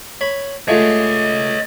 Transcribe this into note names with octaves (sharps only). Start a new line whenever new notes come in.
C#5 B5
G#3 A3 F4 C#5 D#5